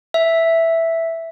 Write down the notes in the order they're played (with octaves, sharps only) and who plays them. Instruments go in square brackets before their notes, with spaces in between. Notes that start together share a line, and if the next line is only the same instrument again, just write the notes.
[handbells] E5